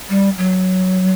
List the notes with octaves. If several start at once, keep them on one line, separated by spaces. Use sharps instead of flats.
G3
F#3